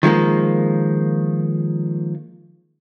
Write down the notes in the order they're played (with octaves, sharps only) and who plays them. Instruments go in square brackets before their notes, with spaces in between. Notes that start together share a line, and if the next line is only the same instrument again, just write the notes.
[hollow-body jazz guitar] D#3 F3 G#3 A#3